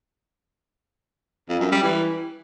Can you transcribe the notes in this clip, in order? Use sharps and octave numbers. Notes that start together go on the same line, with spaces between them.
F2
F#2
G3
E3